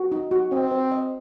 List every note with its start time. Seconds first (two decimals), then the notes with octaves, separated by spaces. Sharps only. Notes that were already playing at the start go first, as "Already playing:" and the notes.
Already playing: F#4
0.12 D#4
0.31 F#4
0.52 C4 D#5
0.72 C5
0.91 D#5